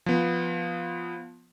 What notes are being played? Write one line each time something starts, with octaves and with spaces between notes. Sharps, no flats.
F3 B3